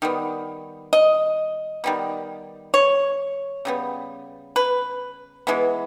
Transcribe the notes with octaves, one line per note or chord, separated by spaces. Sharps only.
D#3 G3 B3
D#5
D#3 G3 B3
C#5
C#3 G3 B3
B4
E3 G#3 B3